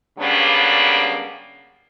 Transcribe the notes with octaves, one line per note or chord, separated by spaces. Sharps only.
C#3 F#3 G3 A#3 B3 D4